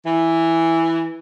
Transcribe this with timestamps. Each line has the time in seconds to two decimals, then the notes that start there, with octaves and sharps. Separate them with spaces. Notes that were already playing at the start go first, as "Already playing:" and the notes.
0.05 E3